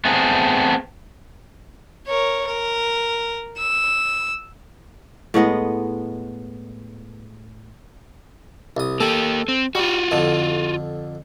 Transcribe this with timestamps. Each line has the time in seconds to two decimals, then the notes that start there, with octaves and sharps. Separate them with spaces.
0.05 A3 B3 C4 G#4
2.07 A#4 C#5
2.46 A#4
3.57 E6
5.34 A2 G#3 B3 D#5
8.77 C2 D#6
9.00 A#3 G4 A4
9.48 C4
9.75 G3 F4 F#4
10.11 F2 D3